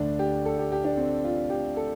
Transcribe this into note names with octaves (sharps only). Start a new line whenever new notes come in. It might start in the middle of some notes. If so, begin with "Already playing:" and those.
Already playing: D2 D3 D4
G4
A4
G4
G4
D4
C4
F4
G4
A4